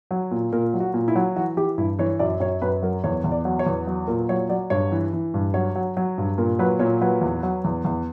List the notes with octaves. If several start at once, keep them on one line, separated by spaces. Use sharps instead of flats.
F#3
A#2
A#2 A#4
F#3
F#4
A#2
E4
F#3
E3 F#4
E3 G4
G2 E4
E3 C#5
F#2 D5
F#2 C#5
F#2 B4
F#3 A#4
E2 C#5
E2
D5
F#3
C#5
E2
F#3
A#2 A#4
F#3 C#5
F#3 D5
G2 C#5
E3
E3
G2
F#3 C#5
F#3
F#3
G2
A#2 A#4
F#3 B4
A#2 C#5
F#3 B4
E2
F#3
E2
E2